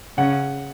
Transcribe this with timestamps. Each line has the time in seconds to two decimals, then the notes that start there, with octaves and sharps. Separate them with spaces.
0.17 C#3 F#5